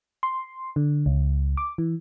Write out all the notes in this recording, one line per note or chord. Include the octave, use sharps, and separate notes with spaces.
C6
D3
C#2
D6
E3